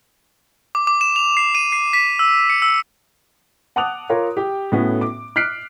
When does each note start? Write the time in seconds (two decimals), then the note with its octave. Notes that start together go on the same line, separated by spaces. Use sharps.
0.75 D6
0.87 D6
1.01 E7
1.16 F7
1.37 C7
1.55 D#7
1.72 C7
1.93 B6
2.19 E6
2.50 C#7
2.62 E6
3.76 F#5 A5 D6 D#6 F#6 F7
4.09 F4 A#4 C#5 A#5
4.37 G4 G5
4.72 A2 A3 B3 C#4 F#4
5.01 D6
5.36 F6 F#6 B6 C7 D7